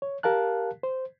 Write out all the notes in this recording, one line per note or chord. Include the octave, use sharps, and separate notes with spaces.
C#5
G4 A#4 F5 A5 F#6
C5